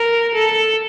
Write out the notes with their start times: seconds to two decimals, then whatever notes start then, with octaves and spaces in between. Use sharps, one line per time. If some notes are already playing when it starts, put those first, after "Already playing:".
Already playing: A#4
0.34 A4